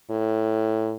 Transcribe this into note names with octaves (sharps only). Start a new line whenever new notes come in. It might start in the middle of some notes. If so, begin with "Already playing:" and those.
A2